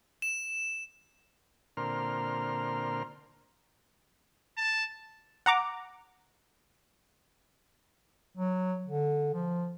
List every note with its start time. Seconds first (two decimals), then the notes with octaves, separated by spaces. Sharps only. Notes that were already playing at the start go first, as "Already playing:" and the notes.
0.22 E7
1.77 A#2 D3 C4 A#4 C6 F6
4.57 A5
5.46 F#5 A#5 D6
8.37 F#3
8.86 D3
9.34 F3